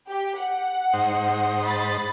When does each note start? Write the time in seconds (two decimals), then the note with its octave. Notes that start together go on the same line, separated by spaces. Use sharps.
0.11 G4
0.40 F#5
0.93 G#2 D#4 C5
1.65 B5 A6